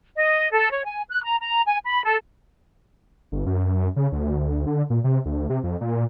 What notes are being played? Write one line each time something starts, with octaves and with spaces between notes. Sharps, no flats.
D#5
A4
C#5
G#5
F#6
A#5
A#5
G#5
B5
A4
G1
F#2
C#3
D2
D3
A#2
C3
D2
C3
F2
A#2